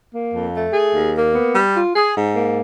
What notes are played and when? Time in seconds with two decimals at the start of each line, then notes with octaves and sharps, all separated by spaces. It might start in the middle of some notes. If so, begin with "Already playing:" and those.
0.13 A#3
0.33 F2
0.54 A3
0.74 G#4
0.94 D#2
1.14 A#3
1.35 B3
1.55 G3
1.76 F4
1.96 G#4
2.17 G#2
2.36 A#3